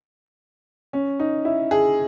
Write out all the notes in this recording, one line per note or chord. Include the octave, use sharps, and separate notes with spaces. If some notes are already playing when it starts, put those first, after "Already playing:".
C#4
D#4
E4
G#4